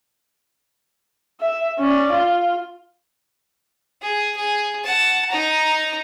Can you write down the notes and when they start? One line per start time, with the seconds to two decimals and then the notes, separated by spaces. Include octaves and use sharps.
1.40 E5
1.78 C#4 D5
2.12 F4
4.02 G#4
4.36 G#4
4.84 F#5 A5
5.31 D#4 A#5